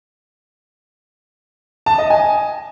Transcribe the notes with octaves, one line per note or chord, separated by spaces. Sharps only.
A5
D#5
G#5